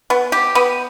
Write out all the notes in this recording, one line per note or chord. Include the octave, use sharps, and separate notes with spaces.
B3
G4
B3